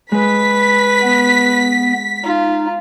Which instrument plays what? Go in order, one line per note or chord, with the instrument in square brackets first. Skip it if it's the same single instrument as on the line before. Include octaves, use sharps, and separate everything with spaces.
[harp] G#3 [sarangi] B4 [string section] B6
[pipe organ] B3
[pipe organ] D#4 [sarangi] F4